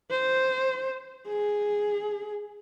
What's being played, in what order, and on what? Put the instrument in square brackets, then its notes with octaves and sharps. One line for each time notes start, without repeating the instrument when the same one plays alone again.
[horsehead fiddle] C5
G#4